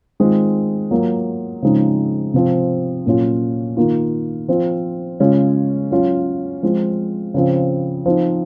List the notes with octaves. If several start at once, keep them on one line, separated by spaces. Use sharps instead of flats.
D#3 G#3 C4 F4
F#3 A#3 F4
C#3 F3 G#3 C4 D#4
C3 F3 C4
A#2 F#3 C#4 F4
D#3 A#3 F4
F3 C4 F4
C#3 G#3 C#4 F4
F#3 C#4 F4
F3 G#3 C4 F4
C#3 F3 C4
F3 C4 D#4